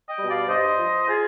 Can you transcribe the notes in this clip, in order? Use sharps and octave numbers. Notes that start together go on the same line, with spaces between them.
D#5 G5
B2 G3
D5 F5
G2 C5 D#5
F3
F4 G#4